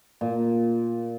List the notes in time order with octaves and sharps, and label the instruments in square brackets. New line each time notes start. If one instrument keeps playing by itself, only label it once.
[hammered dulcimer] A#2